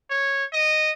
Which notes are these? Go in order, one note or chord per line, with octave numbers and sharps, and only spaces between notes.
C#5
D#5